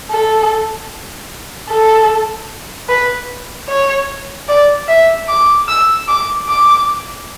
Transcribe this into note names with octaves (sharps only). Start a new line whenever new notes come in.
A4
A4
B4
C#5
D5
E5
D6
E6
D6
D6